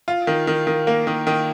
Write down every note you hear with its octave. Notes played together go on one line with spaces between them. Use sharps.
F4
D#3
D#3
D#3
A#3
D#3
D#3